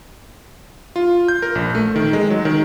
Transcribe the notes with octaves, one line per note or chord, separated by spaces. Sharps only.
F4
G6
A#4
A#1
A3
D#3
G#3
F#3
D#3